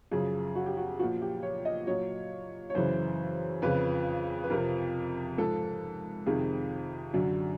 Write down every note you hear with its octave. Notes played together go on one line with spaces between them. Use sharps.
F#2 C#3 F3 G#4
F#4
G4
F#4
A#2 F3 F#4
G4
C#5
D#5
A#2 F#3 C#5
C#5
F#2 C#3 E3 C5
F2 C#3 F3 B4
B4
F2 C3 F3 A#4
G#2 F3 A4
F2 C3 D#3 G#4
F#2 D3 F#3